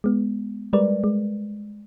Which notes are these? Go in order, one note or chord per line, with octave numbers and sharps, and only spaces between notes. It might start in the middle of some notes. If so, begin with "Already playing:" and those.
G#3 B3
G3 G#3 A#4 B4 D5
G#3